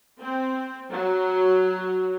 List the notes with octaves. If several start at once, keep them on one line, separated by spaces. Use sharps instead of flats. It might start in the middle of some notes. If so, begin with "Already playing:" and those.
C4
F#3